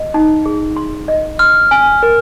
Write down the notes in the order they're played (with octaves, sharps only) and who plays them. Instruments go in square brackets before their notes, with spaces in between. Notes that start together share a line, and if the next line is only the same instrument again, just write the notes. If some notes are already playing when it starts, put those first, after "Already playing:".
Already playing: [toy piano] D#5
D#4
G#4
C6
D#5
[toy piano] C6 [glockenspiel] F6
[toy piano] G#5
A#4